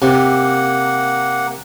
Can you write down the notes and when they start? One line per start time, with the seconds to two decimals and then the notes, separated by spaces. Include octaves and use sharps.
0.02 C3 A#3 F#5